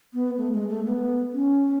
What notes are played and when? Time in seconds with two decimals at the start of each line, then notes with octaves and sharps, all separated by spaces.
0.14 B3
0.37 A3
0.53 G#3
0.69 A3
0.86 B3
1.33 C#4